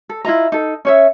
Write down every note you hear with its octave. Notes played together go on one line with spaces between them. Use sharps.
A4
E4 F4 D#5 A#5
D#4 A4
C#4 C#5 E5